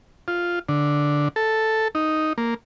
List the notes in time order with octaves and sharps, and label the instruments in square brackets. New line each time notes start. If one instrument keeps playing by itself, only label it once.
[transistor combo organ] F4
D3
A4
D#4
A#3